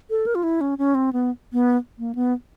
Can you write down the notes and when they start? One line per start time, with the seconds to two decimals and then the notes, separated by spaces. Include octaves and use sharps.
0.10 A4
0.26 A#4
0.35 F4
0.43 E4
0.61 C#4
0.78 C#4
0.95 C4
1.13 B3
1.53 B3
1.99 A#3
2.15 B3